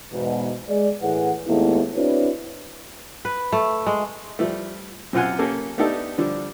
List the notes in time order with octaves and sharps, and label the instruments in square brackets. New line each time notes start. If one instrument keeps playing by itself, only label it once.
[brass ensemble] E2 G#2 B2
G#3 D5
A2 E3 G#4 B4 F#5
D#2 G#3 A3 B3 E4
C4 D4 E4 F#4 B4 C#5
[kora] B4
A3
G#3
[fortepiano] F3 G3 A3
F#2 C3 F4 F#5 G#5
A#3 C#4 G4 A4 A#4
A3 B3 D4 D#4 G4 A4
D3 F3 G3 D4